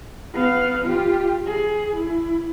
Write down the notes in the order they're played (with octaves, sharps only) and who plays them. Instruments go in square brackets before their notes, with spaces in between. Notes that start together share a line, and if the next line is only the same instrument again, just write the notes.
[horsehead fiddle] B3 F5
F4 G4
G#4
E4